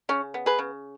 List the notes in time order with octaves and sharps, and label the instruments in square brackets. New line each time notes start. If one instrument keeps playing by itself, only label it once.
[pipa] C#3 C#4
B3
G#4 B4
C#3